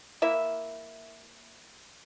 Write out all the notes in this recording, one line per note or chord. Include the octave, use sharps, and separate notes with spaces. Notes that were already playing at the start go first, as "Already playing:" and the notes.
A#3 E4 E5